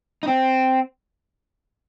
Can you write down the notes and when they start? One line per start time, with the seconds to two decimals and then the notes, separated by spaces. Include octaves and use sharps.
0.23 D#4
0.27 C4